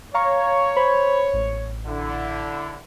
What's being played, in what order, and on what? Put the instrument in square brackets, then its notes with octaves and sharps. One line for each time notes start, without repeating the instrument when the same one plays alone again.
[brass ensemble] C#5 [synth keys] F5 A#5 C#6
[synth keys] C5 B5
A1
[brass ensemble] D3 E4